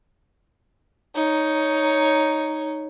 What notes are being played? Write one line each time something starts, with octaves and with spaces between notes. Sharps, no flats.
D#4 C#5